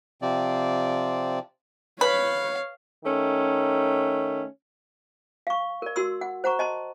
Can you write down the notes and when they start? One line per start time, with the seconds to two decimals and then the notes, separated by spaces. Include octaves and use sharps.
0.22 C3 F3 C4 D5
2.01 B4 C#5 F5
3.05 D#3 A3 C#4
5.47 F5 C#6
5.82 A#4 D5
5.96 F#4 A#4 C6 E6
6.21 F#5
6.44 C5 F#5 A#5 C#6
6.59 D#5 A5 C6